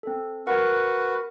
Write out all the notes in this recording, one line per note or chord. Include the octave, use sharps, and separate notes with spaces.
C4 A4
F#4 A#4 B4 F#5